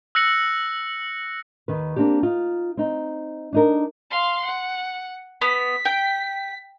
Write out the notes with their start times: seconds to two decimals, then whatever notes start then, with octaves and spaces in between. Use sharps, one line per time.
0.15 E6 F#6 A#6 C#7 F#7
1.68 D#2 D#3 B4
1.96 A#3 C4 D4 G4
2.23 D#4 F4
2.77 C4 D#4
3.53 D4 D#4 A#4
4.10 F5 C6
4.45 F#5
5.41 B3 B6
5.85 G5